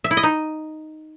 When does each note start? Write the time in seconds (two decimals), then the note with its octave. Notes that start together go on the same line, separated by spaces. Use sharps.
0.04 E5
0.11 E4
0.17 D#5
0.23 D#4